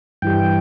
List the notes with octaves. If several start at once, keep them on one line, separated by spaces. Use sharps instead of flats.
G2 E3 G3 G5